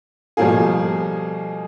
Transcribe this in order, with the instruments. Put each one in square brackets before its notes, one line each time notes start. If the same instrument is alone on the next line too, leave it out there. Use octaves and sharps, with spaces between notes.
[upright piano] B2 F3 G3 A3 A#3 G#4